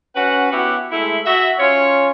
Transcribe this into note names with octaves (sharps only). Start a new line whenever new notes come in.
C#4 F#4 B4 F#5
B3 E4 F#4 G4
G#3 A3 E4
F#4 E5
C#4 F4 C#5